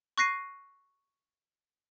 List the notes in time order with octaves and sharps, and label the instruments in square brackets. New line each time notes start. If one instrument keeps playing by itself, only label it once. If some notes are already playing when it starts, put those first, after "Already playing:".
[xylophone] C#6 F#6 A#6 C7 D#7